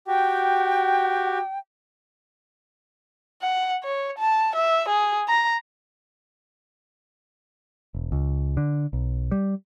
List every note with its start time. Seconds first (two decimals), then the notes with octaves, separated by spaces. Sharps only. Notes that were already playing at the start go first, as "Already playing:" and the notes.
0.07 F#4 G4 G5
3.42 F#5
3.84 C#5
4.18 A5
4.55 E5
4.88 G#4
5.28 A#5
7.94 E1
8.12 C#2
8.57 D3
8.93 B1
9.31 G3